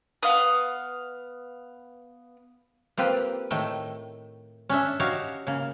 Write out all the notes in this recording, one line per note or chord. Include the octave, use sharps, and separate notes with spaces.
B3 F5 D#6
A#3 C4 F4 G4 B4
A2 D#3 A3 G5
C#4 D4 E5
D#4 F#4 G4 C#5 E5 F5
C#3 A#3